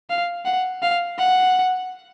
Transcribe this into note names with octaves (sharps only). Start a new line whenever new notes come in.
F5
F#5
F5
F#5